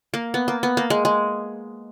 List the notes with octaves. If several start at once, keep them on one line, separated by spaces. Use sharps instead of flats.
A#3
B3
A#3
B3
A#3
G#3
G#3